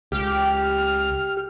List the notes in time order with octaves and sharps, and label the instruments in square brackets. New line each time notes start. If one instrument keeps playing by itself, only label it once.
[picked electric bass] C#2 [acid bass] G4 [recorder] F6